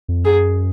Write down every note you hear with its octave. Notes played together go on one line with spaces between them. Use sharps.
F2
F#2 G#4